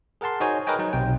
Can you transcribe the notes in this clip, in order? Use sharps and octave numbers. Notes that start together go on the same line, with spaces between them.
G#4 A#4 F#5 A5 C6
D#4 F#4 G#4 C5 C#5 G#5
A#4 B4 C#5 D#5 G5 G#5
F#3 D#4
B1 C3 G5